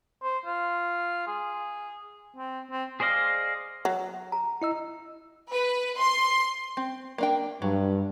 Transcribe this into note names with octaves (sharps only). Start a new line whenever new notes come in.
C5
F4
G#4
C4
C4
G#4 C5 D5 D#5 F5
F#3
A#5
E4 D#5 E6
B4
C6
C4
A#3 D4 G5
G2 F#3